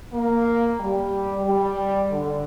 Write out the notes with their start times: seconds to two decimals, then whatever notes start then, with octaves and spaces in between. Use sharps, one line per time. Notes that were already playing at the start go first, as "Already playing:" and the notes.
0.13 A#3
0.80 G3
1.46 G3
2.12 D3